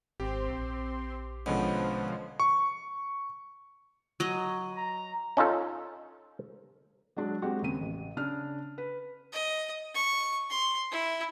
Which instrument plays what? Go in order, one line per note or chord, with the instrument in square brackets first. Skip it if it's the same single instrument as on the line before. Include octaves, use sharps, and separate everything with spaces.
[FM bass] G#1 [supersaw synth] C4 C6 [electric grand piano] G4
[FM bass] A#1
[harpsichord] B2 [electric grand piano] D3 G#3 C#4 [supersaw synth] F3 C5
[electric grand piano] C#6
[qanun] F#3 D#5
[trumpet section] A#5
[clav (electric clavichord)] C#4 D#4 F4 A4
[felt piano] F#3 G#3 D4 F#4
G#3 C4 F#4 G4
D#2 C#3 C4 D#7
A1
C#3 D4 F6
B4
[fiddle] D#5
C#6
C6
E4